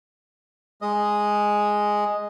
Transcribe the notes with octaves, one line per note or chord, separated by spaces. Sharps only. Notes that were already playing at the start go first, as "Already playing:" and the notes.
G#3 D#5